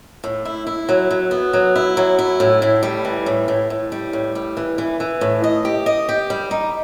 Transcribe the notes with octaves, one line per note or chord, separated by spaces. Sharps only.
A2
E4
E4
F#3
F#3
B3
F#3
E4
F#3
E4
A2
A2
G3
E3
A2
A2
A2
G3
A2
G3
E3
E3
E3
A2
D#5
G4
D#5
G4
G3
D#4